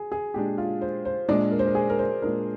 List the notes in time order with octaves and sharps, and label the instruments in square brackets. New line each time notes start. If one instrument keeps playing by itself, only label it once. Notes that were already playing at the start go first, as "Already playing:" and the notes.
Already playing: [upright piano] G#4
G#4
[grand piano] A#2 G#3 D4 [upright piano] G4
[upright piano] F4
C5
C5
[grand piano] A#2 G#3 D4 [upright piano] D5
[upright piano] A#4
C5
A#4
G#4
A#4
C5
[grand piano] A#2 G#3 D4 [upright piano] A#4